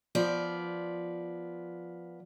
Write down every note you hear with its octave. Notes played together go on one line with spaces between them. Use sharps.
F3 B3 D5